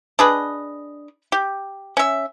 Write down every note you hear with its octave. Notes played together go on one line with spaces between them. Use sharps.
D4 G#4 B4 D#5
G4
C#4 E5